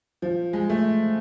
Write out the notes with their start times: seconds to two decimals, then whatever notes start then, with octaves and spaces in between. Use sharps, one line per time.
0.22 F3
0.53 G#3
0.70 A3